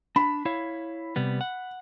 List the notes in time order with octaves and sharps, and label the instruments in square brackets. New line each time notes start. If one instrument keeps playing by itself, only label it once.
[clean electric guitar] D4 [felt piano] B5
[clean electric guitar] E4 C#5 F5
C3 G3 B3
F#5